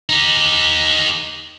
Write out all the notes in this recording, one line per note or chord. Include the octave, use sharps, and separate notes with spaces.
D#4 G4